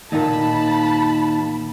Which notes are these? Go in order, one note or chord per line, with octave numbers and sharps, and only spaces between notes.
D#2 A#2 D#4 D#5 A5 B5